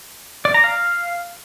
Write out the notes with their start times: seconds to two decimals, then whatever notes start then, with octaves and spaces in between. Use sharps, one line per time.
0.45 D5
0.54 A#5
0.64 F5